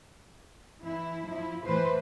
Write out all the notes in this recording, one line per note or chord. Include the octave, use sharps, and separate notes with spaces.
E3 E4
F3 E4
A2 E3 B4 C5